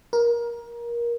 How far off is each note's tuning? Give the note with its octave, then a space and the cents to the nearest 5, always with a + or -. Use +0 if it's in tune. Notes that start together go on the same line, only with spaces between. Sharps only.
A#4 +20